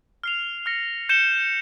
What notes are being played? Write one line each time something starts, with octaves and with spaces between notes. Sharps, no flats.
F6 C7 F7
F6 A#6 C#7
G6 C#7 E7 G7